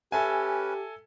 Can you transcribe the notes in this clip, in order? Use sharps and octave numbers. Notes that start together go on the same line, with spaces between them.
C#4 G4 A4 B4 E5 G#5